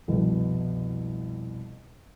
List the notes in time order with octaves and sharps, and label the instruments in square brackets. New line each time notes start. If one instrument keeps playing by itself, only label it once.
[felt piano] C2 F2 B2